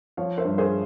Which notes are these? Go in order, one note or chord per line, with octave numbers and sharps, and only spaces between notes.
F3 C#5 F5
C5 E5
G2
G#4 C5